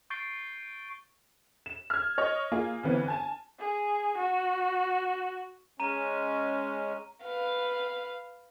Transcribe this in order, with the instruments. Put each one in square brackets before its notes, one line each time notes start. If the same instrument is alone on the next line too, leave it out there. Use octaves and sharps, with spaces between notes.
[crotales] C#6 G6 A6 C7 D7 G7
[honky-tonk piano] E7
F6 G#6
C#5 D#5
A#3 F4 G#4
G1 E3 B3 C4
G#5 A5
[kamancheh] G#4
F#4
[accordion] G#3 C#4 [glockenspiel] A#5 D#7
[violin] B4 F5